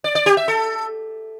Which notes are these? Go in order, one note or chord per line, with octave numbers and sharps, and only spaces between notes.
D5
D5
G4
E5
A4